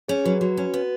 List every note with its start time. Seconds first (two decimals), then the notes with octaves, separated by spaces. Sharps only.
0.08 C#4 G#4 C#5
0.24 F#3 F#4 B4
0.41 F#3 F#4 B4
0.57 C#4 F#4
0.74 B3